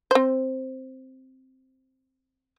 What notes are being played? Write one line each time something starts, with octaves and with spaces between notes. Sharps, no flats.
C4 C5